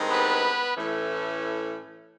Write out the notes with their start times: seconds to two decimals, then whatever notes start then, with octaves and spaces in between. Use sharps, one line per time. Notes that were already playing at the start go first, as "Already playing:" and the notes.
Already playing: G2 D#3 G#3 C4
0.10 B3 B4
0.75 A2 E3 A3 C#4